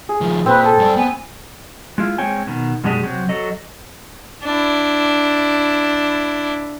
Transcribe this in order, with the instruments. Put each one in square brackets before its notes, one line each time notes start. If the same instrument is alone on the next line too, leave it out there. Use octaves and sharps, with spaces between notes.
[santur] G#4
[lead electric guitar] D#3 F3
[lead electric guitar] A#2 [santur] C4 [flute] B4
[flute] A4 [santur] G#5
[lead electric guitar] G2 D5
[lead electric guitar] B3 [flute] G#5
[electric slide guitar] G#3 E4 F4
G#3 C4 C#5 G5 G#5
B2 D#3
F#2 B2 G#3 D4 G4 G#4
C3 F#3 C4
F#3 A4 D#5
[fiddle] D4 E4